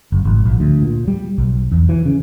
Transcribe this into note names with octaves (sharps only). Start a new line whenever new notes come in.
F#1
G#1
A#1
D2
A#2
G3
B1
E2
E3
C#3